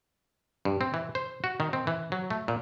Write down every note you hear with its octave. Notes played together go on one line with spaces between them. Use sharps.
G2
C4
E3
C5
F#4
D#3
C4
E3
F#3
A3
A#2